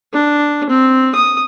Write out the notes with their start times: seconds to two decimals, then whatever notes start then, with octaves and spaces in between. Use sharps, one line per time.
0.13 D4
0.70 C4
1.15 D#6